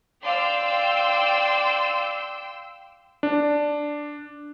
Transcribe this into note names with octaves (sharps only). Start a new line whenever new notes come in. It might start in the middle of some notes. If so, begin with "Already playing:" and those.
D5 F5 G5 C6 E6
D4